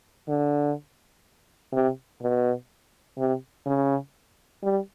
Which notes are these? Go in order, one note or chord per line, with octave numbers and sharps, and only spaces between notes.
D3
C3
B2
C3
C#3
G3